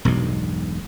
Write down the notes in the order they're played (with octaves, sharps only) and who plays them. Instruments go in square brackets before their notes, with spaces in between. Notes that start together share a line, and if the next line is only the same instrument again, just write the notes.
[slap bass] E1 B1 G2 B2